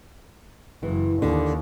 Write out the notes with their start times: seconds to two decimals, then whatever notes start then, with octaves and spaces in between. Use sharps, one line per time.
0.83 F#1 E3
1.22 D#2 D3